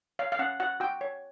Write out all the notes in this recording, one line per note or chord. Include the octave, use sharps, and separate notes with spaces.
C#5 F5
F5
C#4 F#5
F#4 F#5
F#4 G5
C#5